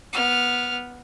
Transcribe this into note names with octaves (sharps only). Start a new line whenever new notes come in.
B3 F6